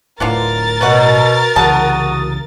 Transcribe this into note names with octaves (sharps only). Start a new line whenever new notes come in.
D1 A2 B3 D4 F4 A#4 A6
B2 B4 C#5 F#5
C2 C#3 E3 F#4 A5 D#6